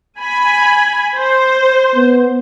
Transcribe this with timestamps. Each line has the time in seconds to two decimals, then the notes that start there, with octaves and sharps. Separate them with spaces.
0.19 G#5 B5
1.17 C5
1.95 B3